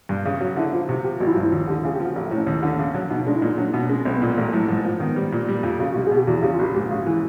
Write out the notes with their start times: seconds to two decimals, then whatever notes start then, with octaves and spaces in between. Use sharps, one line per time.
0.09 G2 F4
0.25 C#3
0.41 F#3 F#4
0.56 D3 E4
0.72 F3 F4
0.88 C3 F#4
1.04 F3 G4
1.20 G#1 F#4
1.27 E4
1.31 F4
1.36 G2
1.42 E4
1.52 D#2 F4
1.67 D3 G4
1.84 C#3 G#4
1.94 G4
2.00 F3
2.05 F#4
2.15 A1 F4
2.26 E4
2.31 A2 C#4
2.47 D#2
2.63 D3
2.79 C#3
2.94 F#3
3.10 B2 D#4
3.26 G#3 D4
3.35 E4
3.42 A#2 D#4
3.58 F#3 D4
3.71 B2 D#4
3.80 D4
3.89 G#3 C#4
4.05 B1 C4
4.16 B3
4.22 A#2 A#3
4.37 A1 A3
4.53 A2 F#3
4.68 G#2 F3
4.84 F3 A#3
5.00 D#3 B3
5.16 G3
5.32 A#2
5.48 G3
5.63 F2 F4
5.79 C#3 F#4
5.91 F#4
5.95 C2 G4
6.06 G#4
6.11 B2
6.16 G4
6.27 E2 F#4
6.42 C#3 G4
6.53 F4
6.59 A#1 F#4
6.74 G#2 G4
6.90 C#3 F#4
7.06 E3 G#4